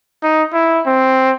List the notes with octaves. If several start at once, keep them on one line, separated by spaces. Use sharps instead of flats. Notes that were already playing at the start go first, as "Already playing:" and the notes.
D#4
E4
C4